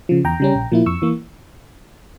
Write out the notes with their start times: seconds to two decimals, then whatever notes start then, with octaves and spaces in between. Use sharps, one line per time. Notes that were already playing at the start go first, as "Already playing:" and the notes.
0.09 C#3 F3
0.24 E2 G5 A#5
0.40 C#3 G3 C#4
0.55 A#1
0.72 A#2 F3 A#3 E4
0.86 F2 C#6 E6
1.02 E3 A#3